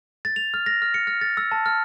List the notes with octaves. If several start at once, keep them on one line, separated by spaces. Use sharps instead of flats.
A6
F7
F6
A#6
F6
C#7
F6
A6
E6
A5
F6